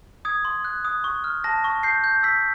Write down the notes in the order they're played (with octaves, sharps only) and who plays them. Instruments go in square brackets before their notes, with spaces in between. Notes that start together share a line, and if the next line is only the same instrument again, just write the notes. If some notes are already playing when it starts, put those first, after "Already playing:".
[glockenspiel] D#6 G#6
C6
F#6
D#6
C#6
F6
A5 A#6
C#6
G6 C7
G6
E6 B6